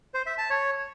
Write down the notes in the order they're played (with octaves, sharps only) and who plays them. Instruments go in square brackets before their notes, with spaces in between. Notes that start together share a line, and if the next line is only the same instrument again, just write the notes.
[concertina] C5
E5
A5
C#5